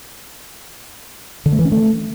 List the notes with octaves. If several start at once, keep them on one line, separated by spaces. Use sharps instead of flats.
D3
A3
E3
C#4
A3